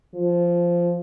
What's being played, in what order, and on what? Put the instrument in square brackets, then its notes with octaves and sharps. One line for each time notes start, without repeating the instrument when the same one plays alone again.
[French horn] F3